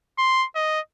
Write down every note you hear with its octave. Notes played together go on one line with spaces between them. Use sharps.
C6
D#5